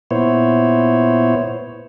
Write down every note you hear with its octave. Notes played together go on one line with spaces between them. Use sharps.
A#2 B3 E4 C5 C#5